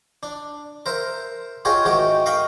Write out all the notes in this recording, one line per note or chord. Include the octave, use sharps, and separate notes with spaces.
D4
A#4 C5 E5
F4 G4 G#4 C#5 D#5
G#2 D#3 A3 F#4 G4
D#5 F5 G5 B5 C#6